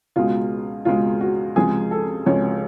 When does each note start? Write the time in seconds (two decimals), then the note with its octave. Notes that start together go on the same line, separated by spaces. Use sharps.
0.16 C#2 B2 G#3 F4
0.85 C#2 B2 G#3 F4
1.21 F#4
1.56 C#2 C3 F3 G#3 G#4
1.91 A4
2.26 C#2 C3 F3 G#3 C#5